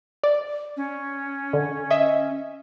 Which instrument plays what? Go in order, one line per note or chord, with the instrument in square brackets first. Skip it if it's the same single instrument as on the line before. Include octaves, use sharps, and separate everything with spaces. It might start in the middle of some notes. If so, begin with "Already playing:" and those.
[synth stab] D5
[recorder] C#4
[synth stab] D3
D#5 E5